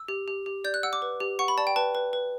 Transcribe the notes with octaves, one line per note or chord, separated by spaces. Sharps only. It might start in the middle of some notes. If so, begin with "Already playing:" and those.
Already playing: E6
G4
G4
G4
D5 G6
F#6
F#5 E6
D6
B4
G4
F#5 C#6
B5
D5 A5
G5
B4 A5
B4
B4